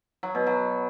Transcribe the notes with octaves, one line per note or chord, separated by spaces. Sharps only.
F#3
B2
F#3